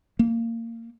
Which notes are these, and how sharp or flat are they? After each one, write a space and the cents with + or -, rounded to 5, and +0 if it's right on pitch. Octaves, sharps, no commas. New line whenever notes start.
A#3 -25